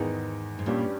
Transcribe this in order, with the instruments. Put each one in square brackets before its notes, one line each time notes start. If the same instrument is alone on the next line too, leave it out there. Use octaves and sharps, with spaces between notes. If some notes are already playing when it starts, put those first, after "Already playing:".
Already playing: [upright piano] E2 D#3 G#3 B3 D#4 [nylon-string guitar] G#2
[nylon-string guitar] G#2
[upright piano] G2 G3 C#4 G4 [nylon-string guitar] A#2